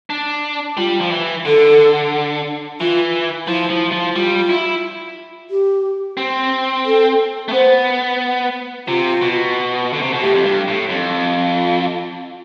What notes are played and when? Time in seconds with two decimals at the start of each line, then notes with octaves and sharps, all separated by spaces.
0.10 D4
0.77 G3 F4
1.01 F3
1.11 E3
1.45 D3 A4
2.81 E3 F4
3.47 F3 E4
3.70 F3
3.92 F3
4.15 G3 F4
4.49 E4
5.50 G4
6.17 C4
6.86 A4
7.48 A3
7.53 B3 C5
8.87 C3 F4
9.22 B2
9.93 D3
10.02 C3
10.13 B2
10.22 A2 G4
10.35 F2
10.45 G2
10.68 A2
10.89 F2
11.58 F4